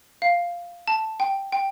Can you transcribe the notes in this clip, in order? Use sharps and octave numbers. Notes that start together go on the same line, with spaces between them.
F5
A5
G5
G5